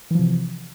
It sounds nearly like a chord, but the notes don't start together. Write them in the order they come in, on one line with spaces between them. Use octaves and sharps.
E3 F3 C3